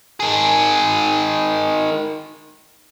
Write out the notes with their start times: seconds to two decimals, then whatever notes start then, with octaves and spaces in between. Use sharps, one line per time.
0.20 D#3 G#4